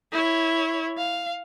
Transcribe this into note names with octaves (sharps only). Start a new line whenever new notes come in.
E4 C#5
F5